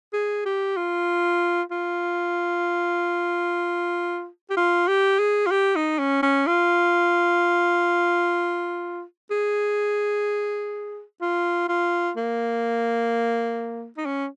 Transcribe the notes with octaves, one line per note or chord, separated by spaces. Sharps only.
G#4
G4
F4
F4
G4
F4
G4
G#4
F4
G4
D#4
C#4
C#4
F4
G#4
F4
F4
A#3
D#4
C#4